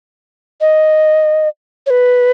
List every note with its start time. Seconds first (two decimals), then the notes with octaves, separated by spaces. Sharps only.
0.61 D#5
1.86 C#5
1.90 B4